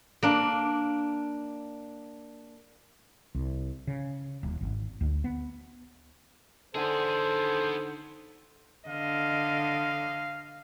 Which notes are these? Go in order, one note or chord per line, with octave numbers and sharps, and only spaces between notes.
A#3 D4
C2
C#3
D#1
G#1
D2
B3
D3 B3 D#4 G#4 A4 C5 F#5
D3 D#5 F5